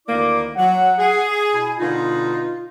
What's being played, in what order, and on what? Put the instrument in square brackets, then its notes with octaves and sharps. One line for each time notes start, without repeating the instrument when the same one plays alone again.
[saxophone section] D2 D#3 A#3 [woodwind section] E4 D5 D6
[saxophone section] F#3 [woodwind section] F#5
[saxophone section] G#4
[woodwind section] B2 E4 G#5
[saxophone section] B2 D3 D#4 [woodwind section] F4